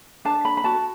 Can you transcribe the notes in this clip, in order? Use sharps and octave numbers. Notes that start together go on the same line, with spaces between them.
D4 A5
B5
B5
F#4 A5